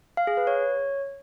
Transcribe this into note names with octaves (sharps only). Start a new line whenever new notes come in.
F5
G#4
B4
C#5